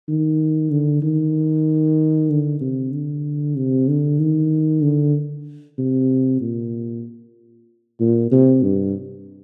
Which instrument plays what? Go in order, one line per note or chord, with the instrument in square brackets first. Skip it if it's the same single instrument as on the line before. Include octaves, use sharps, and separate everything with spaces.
[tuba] D#3
D3
D#3
D3
C3
D3
C3
D3
D#3
D3
C3
A#2
A#2
C3
G2